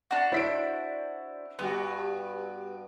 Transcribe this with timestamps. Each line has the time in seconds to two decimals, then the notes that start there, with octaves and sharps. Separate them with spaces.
0.11 D4 F#4
0.32 E4 C5 B6 D7
1.59 G2 G3 B3 F#4